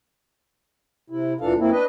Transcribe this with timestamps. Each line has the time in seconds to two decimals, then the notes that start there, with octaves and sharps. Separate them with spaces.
1.10 C3 E4
1.41 D2 A#2 E3 D4 A4 F5
1.58 F#2 A#3 C4 E4
1.71 D4 B4 D#5